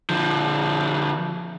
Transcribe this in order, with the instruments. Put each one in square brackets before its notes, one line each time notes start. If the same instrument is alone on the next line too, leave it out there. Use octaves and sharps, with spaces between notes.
[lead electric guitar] D3 F3